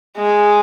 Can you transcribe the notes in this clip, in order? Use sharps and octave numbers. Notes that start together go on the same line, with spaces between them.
G#3